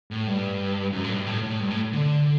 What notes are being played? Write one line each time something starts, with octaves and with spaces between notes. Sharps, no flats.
A2
G2
F#2
A2
G2
A2
A2
G2
A2
D3